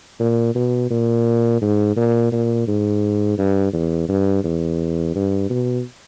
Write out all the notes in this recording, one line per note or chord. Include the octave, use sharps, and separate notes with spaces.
A#2
B2
A#2
G#2
A#2
A#2
G#2
G2
E2
G2
E2
G2
B2